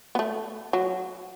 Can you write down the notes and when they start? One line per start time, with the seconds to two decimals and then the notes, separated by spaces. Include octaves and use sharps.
0.15 B3
0.19 A3
0.73 F#3